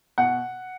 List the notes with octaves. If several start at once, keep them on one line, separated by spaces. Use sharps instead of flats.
B2 F#5